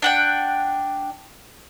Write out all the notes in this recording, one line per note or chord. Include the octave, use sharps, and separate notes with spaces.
D4 F#5 G5